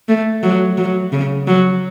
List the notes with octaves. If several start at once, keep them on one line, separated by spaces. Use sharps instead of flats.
A3
F#3
F#3
C#3
F#3